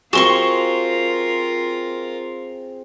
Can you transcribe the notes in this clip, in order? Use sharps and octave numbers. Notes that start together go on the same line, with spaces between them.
C4 F4 F#4 G#4 A#4 C6 C#6